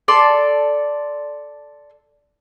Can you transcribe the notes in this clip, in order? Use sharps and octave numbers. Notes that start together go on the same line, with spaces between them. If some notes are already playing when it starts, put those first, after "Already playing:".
A4 D5 C6